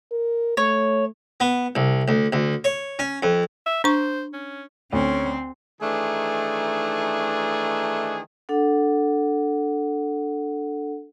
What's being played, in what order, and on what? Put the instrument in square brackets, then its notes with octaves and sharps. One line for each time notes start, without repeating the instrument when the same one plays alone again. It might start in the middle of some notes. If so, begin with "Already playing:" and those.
[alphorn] A#4
[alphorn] A3 [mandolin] C#5
[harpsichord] B3
C2
D2
D2
C#5
C#4
F2
[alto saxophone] E5
[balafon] D4 C#6 [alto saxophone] C5
[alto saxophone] C#4
[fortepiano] D2 [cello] C4 [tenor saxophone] C#4
[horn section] D#3 E3 A3 D4 D#4 G#4
[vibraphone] D4 A4 F#5